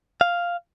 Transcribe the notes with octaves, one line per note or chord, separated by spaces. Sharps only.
F5